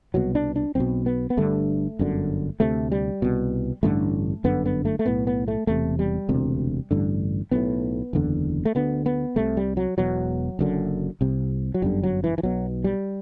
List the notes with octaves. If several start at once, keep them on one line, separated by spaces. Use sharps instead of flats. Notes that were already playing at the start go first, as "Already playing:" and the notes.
C2 B2 F#3
D4
D4
B1 B2 C4
B3
B3
G1 G2 D3 A3
G1 F#2 D3
D2 C3 A3
G3
C2 B2
A1 G2 D3 A3
G1 F#2 D3 B3
B3
A3
A3
B1 A2 B3
B3
A3
E1 E2 C3 A3
G3
E1 D2 C3
A1 G2 D3
B1 A2 B3
F#1 E2 D3
A3
D2 D3 B3
B3
C2 C3 A3
G3
F#3
E1 E2 B2 F#3
F#1 F#2 D3
C2 C3
F#3
G1 F#2 D3 G3
F#3
E3
E3
B1 B2 F#3
G3